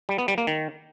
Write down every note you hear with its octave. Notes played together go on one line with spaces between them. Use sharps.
G3
B3
G3
A#3
D#3